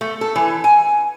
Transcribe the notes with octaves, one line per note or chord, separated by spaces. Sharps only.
A3
A4
E3
G#5